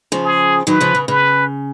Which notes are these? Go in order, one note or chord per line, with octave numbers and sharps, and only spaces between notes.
C#3 F3
G#4
D#3 F#3 B4
C#3 F3
C#3
C#3 B4